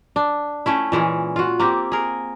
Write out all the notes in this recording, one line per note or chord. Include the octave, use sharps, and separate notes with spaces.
D4
A3 C#4 E4
A#2 E3 G#3 C#4
F4 F#4
A#3 C4 G4
G#4 A#4